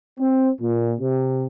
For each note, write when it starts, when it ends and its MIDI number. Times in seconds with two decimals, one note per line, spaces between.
0.19 0.49 60
0.61 0.94 46
1.00 1.46 48